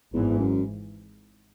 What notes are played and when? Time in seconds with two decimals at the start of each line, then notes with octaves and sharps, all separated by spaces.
0.14 G#1 E2 G#2 E3
0.39 F#2